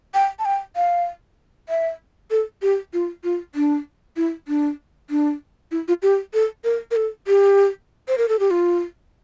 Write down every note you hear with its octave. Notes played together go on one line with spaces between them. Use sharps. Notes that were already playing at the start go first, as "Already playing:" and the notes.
G5
A5
G5
F5
E5
A4
G4
F4
F4
D4
E4
D4
D4
E4
F4
G4
A4
A#4
A#4
A4
G4
C5
A#4
A4
G4
F4